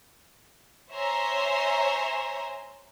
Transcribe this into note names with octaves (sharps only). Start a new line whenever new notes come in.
C5 C#5 E5 G#5 A#5 C6